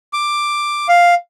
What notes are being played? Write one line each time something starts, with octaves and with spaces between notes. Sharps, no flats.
D6
F5